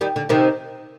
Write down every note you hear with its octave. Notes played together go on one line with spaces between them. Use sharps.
D#3 G3
D3
C3 D#3